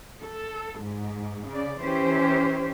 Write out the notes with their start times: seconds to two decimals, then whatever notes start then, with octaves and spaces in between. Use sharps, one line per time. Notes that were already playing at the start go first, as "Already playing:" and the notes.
0.24 A4
0.82 G#2
1.49 C#3 D5
1.83 E3 C#4 G4 C5